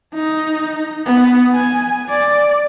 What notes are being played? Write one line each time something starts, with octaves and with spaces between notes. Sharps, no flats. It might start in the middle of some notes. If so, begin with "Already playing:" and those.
D#4
B3
G#5
D5